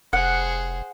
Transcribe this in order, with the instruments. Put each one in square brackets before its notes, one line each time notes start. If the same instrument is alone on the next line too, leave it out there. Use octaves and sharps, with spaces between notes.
[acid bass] F1 [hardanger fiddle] G#4 C5 [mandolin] F#5